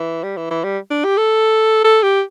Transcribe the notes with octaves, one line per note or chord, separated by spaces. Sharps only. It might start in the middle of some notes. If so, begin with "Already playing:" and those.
Already playing: E3
G3
E3
E3
G3
D4
G4
A4
A4
G4